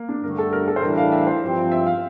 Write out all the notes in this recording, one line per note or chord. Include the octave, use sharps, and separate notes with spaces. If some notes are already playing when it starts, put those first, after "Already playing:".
Already playing: A#3
D4
G2 D3 A3 A#4
A4
A#4
A4
C5
A2 E3 G3 D4 A#4
F5
E5
C5
G2 F3 C4
E5
F5